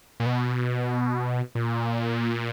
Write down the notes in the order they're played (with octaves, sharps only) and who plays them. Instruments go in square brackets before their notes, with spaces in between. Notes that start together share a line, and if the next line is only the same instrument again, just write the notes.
[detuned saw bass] A#2
B2
A#2